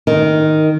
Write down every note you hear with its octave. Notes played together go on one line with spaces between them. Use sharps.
D#3